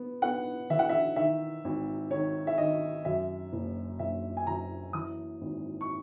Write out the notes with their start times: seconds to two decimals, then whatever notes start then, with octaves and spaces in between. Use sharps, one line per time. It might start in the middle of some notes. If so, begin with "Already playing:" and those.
Already playing: B3
0.22 B3 F#5
0.70 E3 E5
0.79 F#5
0.89 E5
1.16 D#3 E5
1.65 G#1
2.11 D#3 C#5
2.47 E5
2.58 D#3 D#5
3.05 F#2 E5
3.53 F#1
3.99 F#1 E5
4.37 G#5
4.47 F#2 A#5
4.93 E3 D#6
5.41 G#1
5.81 C#6